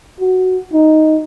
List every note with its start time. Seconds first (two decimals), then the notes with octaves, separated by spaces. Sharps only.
0.20 F#4
0.73 D#4